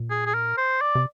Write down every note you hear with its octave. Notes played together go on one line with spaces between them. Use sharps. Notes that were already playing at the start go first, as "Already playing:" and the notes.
Already playing: A#2
G#4
G#4
A#4
C5
D5
C3